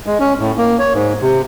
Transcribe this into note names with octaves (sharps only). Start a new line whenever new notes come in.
G#3
C#4
A2
A#3
C#5
G#2
C3